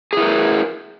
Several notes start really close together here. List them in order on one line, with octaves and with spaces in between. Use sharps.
G#4 E4 A#4